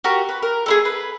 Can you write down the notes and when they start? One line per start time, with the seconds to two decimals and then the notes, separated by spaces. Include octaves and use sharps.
0.04 F#4 G4 A#4
0.29 B4
0.43 A#4
0.66 A3 E4 G#4
0.85 B4